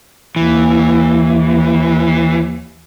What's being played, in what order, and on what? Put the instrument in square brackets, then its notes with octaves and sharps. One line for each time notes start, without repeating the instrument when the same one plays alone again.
[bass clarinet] D#2 [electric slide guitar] E3